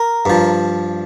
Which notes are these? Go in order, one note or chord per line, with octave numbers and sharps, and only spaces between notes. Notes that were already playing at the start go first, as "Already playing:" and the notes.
Already playing: A#4
G2 F3